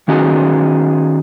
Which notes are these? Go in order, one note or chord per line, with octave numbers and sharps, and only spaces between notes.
D#3 C#4 D#4 F#4 G#4